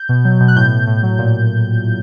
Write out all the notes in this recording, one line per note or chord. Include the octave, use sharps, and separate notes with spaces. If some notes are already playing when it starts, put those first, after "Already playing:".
Already playing: G6
B2
F#3
B2
F#6
A2 G6
A2
A2
F#3
A#2